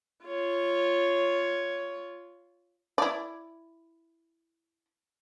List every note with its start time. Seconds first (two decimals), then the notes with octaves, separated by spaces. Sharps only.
0.25 F4 C#5
2.98 E4 D5